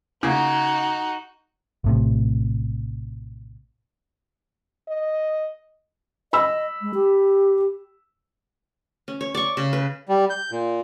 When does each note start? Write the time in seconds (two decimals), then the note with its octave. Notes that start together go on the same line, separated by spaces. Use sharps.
0.23 C#3 A#3 D#4 F#4
1.84 A#1 A2 C3
4.88 D#5
6.33 D#5 B5 E6
6.82 G#3
6.94 G4
9.08 C#4
9.21 C#5
9.35 D5 C#6
9.57 C#3
9.73 B4
10.08 G3
10.30 G6
10.51 A#2